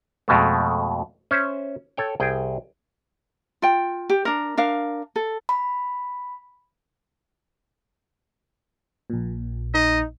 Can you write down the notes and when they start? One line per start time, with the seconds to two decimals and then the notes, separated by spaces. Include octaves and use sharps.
0.28 F2 B2 G#3 A3
1.31 C#4 C5 E5
1.97 A4 C#5 G5
2.20 C2 G#4 G5
3.62 F4 G5
4.10 G4
4.25 D4 A#4
4.57 D4 A#4 F5
5.16 A4
5.49 B5
9.10 A#1 A#2
9.74 D#4 D#5